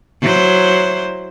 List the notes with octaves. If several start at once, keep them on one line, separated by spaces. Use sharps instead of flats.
F#3 E4 C5